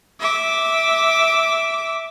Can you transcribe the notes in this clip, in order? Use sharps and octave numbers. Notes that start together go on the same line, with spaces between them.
E5 D6